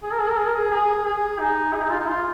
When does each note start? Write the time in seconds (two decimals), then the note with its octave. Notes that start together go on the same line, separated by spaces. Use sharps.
0.03 G#4
0.12 A#4
0.20 G#4
0.30 A#4
0.38 G#4
0.47 A#4
0.55 G#4
0.71 G#4
1.05 G#4
1.39 D#4
1.74 G#4
1.83 D#4
1.91 F4
1.99 D#4
2.08 F4